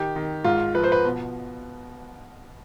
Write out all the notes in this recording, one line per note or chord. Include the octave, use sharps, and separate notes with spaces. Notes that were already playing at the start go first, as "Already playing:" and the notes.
Already playing: D#3 G4
D#3
G#2 F4
F3 B4
C5
B4
B2